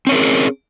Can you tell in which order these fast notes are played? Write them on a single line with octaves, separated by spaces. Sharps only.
C4 C#4 A#4 G#4